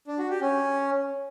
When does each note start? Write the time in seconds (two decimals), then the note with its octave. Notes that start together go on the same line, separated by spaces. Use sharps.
0.07 D4
0.19 F#4
0.30 G4
0.41 C#4